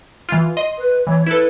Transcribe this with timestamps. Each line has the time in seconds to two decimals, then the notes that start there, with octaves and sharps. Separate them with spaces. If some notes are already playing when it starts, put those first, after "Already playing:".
0.29 E3 F4
0.57 D#5 C6
0.78 B4
1.07 E3 C#5
1.26 E4 A4 B4